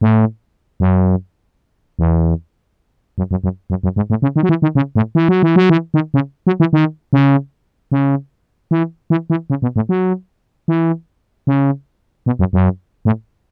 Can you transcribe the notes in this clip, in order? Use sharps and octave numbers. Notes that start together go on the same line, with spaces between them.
A2
F#2
E2
F#2
F#2
F#2
F#2
F#2
G#2
A2
C#3
D#3
F#3
E3
D#3
C#3
A2
E3
F#3
E3
F#3
E3
D#3
C#3
F#3
E3
D#3
C#3
C#3
E3
E3
E3
C#3
B2
A2
F#3
E3
C#3
B2
F#2
F#2
A2